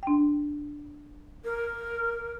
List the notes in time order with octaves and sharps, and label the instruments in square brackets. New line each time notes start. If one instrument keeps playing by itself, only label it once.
[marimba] D4 G5
[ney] A#4